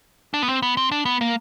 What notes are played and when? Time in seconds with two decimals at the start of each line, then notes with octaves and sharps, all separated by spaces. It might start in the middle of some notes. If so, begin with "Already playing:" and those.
0.34 D4
0.43 B3
0.48 C4
0.62 B3
0.77 C4
0.92 D4
1.05 B3
1.21 A#3